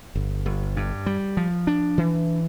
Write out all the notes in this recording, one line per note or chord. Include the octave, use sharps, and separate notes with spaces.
G1
G1
G2
G3
F3
D4
E3